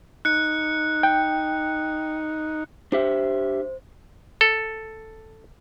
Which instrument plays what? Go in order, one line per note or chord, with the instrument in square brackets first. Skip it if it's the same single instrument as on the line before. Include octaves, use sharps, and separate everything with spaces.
[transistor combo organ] D#4 [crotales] F#6 C#7
[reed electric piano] G5
[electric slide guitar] D4 G4 E5 [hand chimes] C5
[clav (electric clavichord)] A4